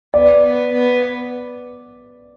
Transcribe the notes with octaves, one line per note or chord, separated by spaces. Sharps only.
B3 D5
B3
B3